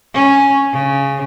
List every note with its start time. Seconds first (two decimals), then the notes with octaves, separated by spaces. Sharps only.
0.14 C#4
0.73 C#3